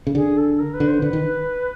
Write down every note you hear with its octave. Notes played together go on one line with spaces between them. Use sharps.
C#3
D3 G#4
A4
A#4
B4
D3
C5
D3 B4
D#3